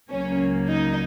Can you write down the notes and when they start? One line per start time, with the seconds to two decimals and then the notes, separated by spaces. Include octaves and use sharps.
0.11 C#2 C#3 F#3 A#3 C#4
0.69 D#4